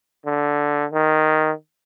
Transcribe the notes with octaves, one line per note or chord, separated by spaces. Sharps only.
D3
D#3